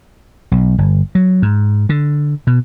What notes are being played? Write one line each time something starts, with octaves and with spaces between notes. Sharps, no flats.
B1
G1
F#3
G#2
D3
B2